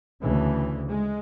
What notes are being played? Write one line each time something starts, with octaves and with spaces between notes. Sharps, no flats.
D2 C#3 E3
G#3